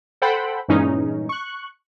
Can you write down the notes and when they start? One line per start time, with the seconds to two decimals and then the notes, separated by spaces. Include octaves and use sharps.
0.22 A4 C5 F#5 G5 B5
0.68 G2 A#2 E3 G#3 C#4 D#4
1.29 C#6 F#6